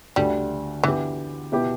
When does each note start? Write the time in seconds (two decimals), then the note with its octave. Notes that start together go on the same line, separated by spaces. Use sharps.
0.16 D2 D3 G3 A3
0.83 D3 E3 B3 E4 G4
1.52 B2 B3 E4 G4